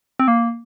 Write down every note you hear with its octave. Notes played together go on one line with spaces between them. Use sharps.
C4
A#3